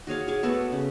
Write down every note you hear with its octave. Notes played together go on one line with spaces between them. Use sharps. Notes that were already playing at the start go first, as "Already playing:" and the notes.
F#4 G#4 C#5 F5
G#4 C#5 C#6 D6
A3 B3 F#4 A4
C#3